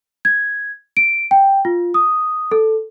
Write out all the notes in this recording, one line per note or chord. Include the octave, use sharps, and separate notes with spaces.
G#6
D7
G5
F4
D#6
A4